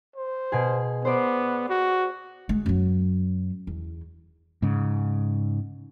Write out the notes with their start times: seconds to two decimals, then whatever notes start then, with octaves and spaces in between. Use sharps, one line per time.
0.16 C5
0.52 B2 G#4
1.05 B3 C5 D5
1.69 F#4
2.49 G#3
2.66 F#2 F#3
3.67 E2
4.62 G#2 C#3